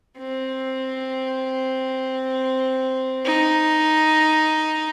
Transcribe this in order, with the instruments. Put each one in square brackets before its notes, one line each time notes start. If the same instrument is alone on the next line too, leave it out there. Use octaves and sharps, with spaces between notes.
[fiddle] C4
D#4